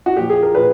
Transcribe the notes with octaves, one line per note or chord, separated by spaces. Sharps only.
F#4
A#2 F3 G4
G#4
A#4
A#2 F3 B4